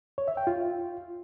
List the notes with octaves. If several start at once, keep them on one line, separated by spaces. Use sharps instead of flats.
C#5
E5
G5
F4